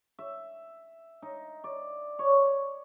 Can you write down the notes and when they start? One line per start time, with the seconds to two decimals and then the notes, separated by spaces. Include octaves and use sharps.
0.19 E5
1.22 D#4
1.64 D5
2.19 C#5